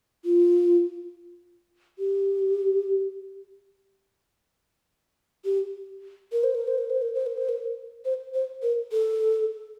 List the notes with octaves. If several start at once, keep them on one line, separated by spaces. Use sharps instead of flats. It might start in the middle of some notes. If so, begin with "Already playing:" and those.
F4
G4
G4
A#4
C5
A#4
C5
A#4
C5
A#4
C5
A#4
C5
A#4
C5
C5
A#4
A4